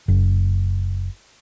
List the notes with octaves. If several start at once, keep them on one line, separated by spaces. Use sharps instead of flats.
F#1